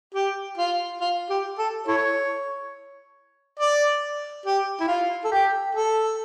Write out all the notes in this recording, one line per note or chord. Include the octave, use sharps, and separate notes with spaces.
G4
F4
F4
G4
A4
E4 A4 C#5
D5
G4
E4
F4
A4
G4
A4